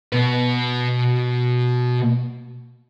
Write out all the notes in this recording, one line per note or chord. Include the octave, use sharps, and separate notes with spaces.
B2 B4